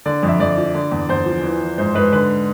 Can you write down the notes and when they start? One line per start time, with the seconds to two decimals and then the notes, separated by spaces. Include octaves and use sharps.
0.06 D3 D5
0.23 F2
0.28 E5
0.40 F2 D5
0.57 F3
0.74 D3
0.92 E2
1.09 E2 C5
1.26 F3
1.44 E3
1.61 E3
1.78 G#2 C5
1.95 G#2 B4
2.12 D3 B4